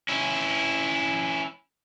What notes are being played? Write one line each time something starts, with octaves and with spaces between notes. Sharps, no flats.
C#4 E4